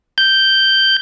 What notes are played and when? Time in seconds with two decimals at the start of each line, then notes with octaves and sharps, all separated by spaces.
0.18 G6